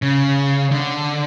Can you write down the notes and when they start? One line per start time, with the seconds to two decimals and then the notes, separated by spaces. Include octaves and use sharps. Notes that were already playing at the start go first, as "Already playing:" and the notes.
0.02 C#3
0.72 D3